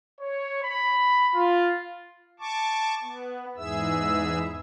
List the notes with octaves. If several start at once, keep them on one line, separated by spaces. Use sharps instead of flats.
C#5
B5
F4
A5 C#6 D6
B3
E2 G#2 E3 G#4 E5 E6